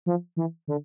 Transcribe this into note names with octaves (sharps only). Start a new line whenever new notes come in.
F3
E3
D3